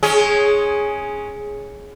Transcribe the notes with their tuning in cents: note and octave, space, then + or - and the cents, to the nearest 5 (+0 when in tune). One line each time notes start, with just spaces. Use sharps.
G#3 +10 C#4 +0 G#4 +0